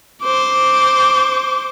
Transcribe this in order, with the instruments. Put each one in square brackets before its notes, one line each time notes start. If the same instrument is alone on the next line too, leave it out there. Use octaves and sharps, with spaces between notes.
[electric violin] C5 D6